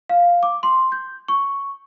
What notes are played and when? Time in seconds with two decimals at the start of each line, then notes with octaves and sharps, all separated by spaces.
0.09 F5
0.43 D6
0.63 C6
0.92 G6
1.28 C#6